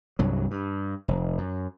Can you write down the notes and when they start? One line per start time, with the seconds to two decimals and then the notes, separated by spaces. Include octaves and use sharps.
0.19 C2 G2 F#3
0.51 G2
1.08 F1
1.38 F#2